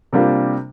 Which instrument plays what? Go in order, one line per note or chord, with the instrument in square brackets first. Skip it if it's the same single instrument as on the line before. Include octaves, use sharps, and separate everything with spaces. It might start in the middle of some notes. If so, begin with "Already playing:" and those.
[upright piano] C3 G3 A#3 D4 F4